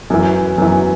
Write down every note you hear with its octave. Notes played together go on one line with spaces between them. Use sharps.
F#2 E3
F#2 E3